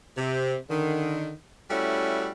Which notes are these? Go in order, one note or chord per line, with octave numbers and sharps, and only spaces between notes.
C3
D3 D#3
G3 A3 C#4 E4 F#4